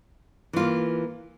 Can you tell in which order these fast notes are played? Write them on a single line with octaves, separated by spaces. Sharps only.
E3 F4 A#3